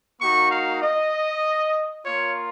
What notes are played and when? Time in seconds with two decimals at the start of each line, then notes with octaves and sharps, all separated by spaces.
0.20 A#3 D#4 F#4 C#6
0.51 F5
0.82 D#5
2.04 A#3 F4 C#5